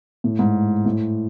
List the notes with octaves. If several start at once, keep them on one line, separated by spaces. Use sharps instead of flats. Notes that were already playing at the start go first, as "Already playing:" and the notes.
A2
G#2
A2